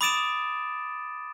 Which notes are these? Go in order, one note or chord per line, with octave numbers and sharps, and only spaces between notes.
B5 D6 D#6 A6 D7 E7